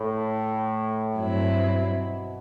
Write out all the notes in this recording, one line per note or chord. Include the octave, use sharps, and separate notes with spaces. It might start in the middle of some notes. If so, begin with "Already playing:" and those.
Already playing: A2
G2 F#3 C4 E4
B2